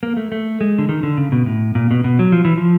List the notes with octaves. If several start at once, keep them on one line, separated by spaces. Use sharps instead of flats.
A#3
A3
A3
G#3
D3
D#3
D3
C#3
B2
A2
A#2
B2
B2
F#3
F3
E3
F3